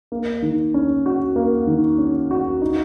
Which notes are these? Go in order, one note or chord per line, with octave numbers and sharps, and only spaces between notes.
A#3
D#3
C#4
F#4
A#3
D#3
C#4
F#4
D#4